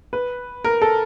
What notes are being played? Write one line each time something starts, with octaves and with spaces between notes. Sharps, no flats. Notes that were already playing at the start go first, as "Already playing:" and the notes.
B4
A#4
A4